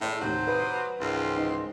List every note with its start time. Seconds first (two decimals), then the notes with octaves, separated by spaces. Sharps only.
0.01 A2 G#3 D4 E4 C5
0.21 D#2 A2 C3 D#3 F#3 C5
0.48 B4 C6 D6 D#6
1.00 C#2 G#2 D#3 E3 C6
1.37 D#4 D#5